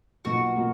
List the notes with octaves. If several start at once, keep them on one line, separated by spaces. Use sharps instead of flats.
B1 B2 A#3 F4 F#4
B2 A#3 F4